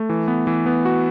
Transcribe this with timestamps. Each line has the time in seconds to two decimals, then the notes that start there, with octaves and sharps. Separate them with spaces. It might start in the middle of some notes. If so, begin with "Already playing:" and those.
Already playing: A3
0.09 E3
0.28 B3
0.47 E3
0.66 B3
0.85 F#4